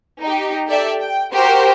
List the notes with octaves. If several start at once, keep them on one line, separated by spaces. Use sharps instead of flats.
D#4 G4
G4 A4 D5 E5
G5
F#4 G4 A#4 C5